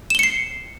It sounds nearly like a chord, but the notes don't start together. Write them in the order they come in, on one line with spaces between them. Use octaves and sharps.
E7 G7 C#7 C7